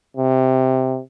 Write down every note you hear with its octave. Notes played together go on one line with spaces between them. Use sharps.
C3